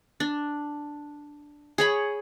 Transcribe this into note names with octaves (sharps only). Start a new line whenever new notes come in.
D4
G#4 C#5 B5